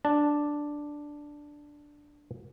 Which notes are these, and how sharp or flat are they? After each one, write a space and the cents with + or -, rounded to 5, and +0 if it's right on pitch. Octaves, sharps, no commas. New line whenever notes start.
D4 +0 A5 +0